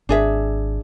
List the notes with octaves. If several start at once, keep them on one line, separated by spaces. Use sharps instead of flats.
G#1 D4 G#4 E5